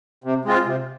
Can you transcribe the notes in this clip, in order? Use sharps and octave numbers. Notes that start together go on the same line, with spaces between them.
C3
G#3 C4 F4
C3